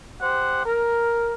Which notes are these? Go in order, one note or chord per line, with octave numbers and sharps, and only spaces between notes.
G4 C5 F#5
A#4